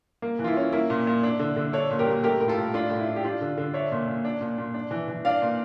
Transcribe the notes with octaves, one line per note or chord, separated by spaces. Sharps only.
A#3
E3
F4
E4
C#4
A#3 E4
A#2
A#2
D4
D3
D3
D4 A4 C#5
A#2
G4 A#4
A#2
A3 G4 A#4
A2 A#4
F4 A4
A2
A3 D4 F4
A2
E4
D4
G4
D4 F4
D3
D3
D4 C#5 E5
A#2
A#2
D4
A#2
A#2
D4
E3
E3
D4 D5 F5
A#2